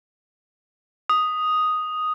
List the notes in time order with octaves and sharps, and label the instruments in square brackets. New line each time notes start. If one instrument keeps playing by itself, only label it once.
[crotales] D#6